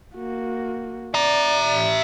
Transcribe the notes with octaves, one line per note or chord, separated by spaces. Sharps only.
A#3 F#4
D5 E5 A#5